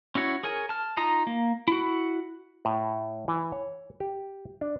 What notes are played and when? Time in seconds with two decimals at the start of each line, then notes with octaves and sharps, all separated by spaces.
0.15 C#4 E4 F#4 C#5
0.43 G#4 A#4 C#5 G#5
0.69 A5 F6
0.97 D#4 F4 A#5 D#6
1.27 A#3
1.68 E4 F#4
2.65 A2
3.28 E3
3.52 C#5
4.00 G4
4.61 D4